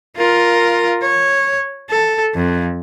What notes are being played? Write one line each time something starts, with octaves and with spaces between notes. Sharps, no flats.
F4 A#4
C#5
A4
F2